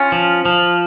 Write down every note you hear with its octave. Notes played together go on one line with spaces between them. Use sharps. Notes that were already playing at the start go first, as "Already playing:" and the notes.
Already playing: C#4 F4
F3
F3